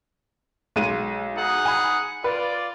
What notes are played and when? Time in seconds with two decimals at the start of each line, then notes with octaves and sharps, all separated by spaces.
0.76 B1 G#3 D#7
1.36 D#4 G#4 F#5
1.65 G#5 B5
2.24 F4 B4 D5